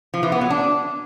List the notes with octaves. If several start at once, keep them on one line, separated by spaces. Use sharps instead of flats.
F3
E3
B3
F#3
D4